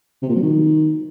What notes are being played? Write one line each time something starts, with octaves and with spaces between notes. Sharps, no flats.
C3
A#2
F#3
D#3